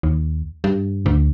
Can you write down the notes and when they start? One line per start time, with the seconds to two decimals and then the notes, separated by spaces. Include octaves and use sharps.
0.03 D#2
0.64 G2
1.06 D2